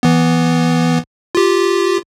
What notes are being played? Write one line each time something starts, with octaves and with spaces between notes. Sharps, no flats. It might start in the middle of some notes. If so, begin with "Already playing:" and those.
E3 B3
F4 G4